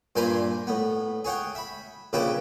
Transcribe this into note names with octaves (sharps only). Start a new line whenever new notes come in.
G2 A#2 C5 G#5 A#5 B5
A2 B3
G#4 C#5 F#5 G5
E5 B5
A#1 C#3 E4 G4 B4 A5